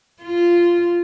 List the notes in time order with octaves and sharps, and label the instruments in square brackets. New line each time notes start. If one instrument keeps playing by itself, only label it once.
[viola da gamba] F4